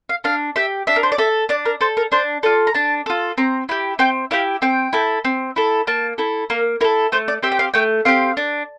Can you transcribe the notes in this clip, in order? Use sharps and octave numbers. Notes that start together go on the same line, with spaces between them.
F5
D4 F5
G4 E5
D4 E5
A#4
C5
D5
A4 E5
D4 D5
A#4
A4 C5
A#4
D4 C5
F4 A4 D5
A#5
D4 A5
F4 A4
C4 A#5
E4 G4
C4 G5
E4 G4 F5
C4 G5
E4 A4
C4
E4 A4
A#3 A5
E4 A4
A#3 A#4
E4 A4 A#4
A3 C5
D5
C4 G4 E5
G5
F5
A3 G5
C4 G4 F5
D4